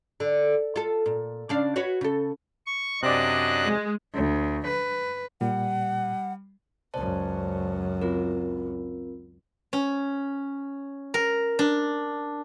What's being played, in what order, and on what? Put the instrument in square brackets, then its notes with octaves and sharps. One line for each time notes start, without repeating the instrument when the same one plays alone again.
[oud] D3
F4 A4
A#2
C#3 D4 F5
F#4 B4 C#5
C#3 A4
[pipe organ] C#6
[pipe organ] F#2 D4 F#6 [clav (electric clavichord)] C3 D5 [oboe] D#5
[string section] G#3
[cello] D2
B4
[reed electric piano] A#2 [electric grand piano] G3 [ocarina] F#5
[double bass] C#2 F#2 [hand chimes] C5 D5 A5
[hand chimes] C4 F4 A#4
[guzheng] C#4
A#4
D4